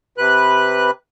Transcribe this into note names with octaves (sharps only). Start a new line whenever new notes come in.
C3 B4 F#6